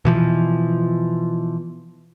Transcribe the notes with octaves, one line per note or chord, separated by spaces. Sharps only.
B2 E3 F3